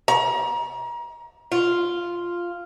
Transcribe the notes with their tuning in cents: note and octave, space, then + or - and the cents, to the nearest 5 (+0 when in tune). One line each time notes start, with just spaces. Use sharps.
A#5 +30
F4 -5